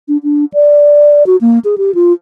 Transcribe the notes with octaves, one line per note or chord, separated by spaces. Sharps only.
D4
D4
D5
F#4
A#3
G#4
G4
F4